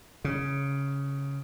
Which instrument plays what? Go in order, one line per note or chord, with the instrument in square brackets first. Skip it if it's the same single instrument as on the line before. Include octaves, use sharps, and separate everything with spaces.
[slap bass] C#3